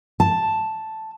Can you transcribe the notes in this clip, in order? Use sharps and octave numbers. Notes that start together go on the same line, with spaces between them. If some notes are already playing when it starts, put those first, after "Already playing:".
A5